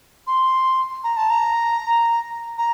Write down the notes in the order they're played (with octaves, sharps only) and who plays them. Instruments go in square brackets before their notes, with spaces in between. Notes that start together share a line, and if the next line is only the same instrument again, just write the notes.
[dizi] C6
A#5
A5
A#5
A#5